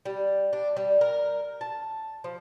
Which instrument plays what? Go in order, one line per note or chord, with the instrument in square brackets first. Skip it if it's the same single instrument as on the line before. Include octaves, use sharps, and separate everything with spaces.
[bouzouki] G3
D4
G3
A#4
A5
F3